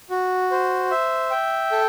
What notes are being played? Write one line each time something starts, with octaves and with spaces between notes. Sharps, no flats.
F#4
C5
E5
G5
A4